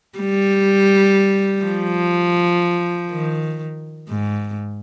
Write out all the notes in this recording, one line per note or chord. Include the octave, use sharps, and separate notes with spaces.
G3
F3
D#3
G#2